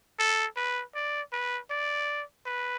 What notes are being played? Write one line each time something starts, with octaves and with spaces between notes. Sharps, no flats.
A4
B4
D5
B4
D5
B4